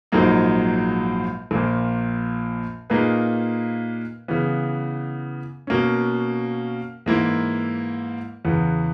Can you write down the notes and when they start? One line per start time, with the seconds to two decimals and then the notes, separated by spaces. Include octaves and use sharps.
0.12 A#1 G#2 F#3 A#3 D#4
1.51 A#1 A#2 A#3
2.90 A#2 A#3 D#4 G#4 B4
4.28 C#3 E3 B3
5.67 B2 A#3 C#4
7.06 G#2 E3 A#3 E4
8.45 E2 C#3 E3 B3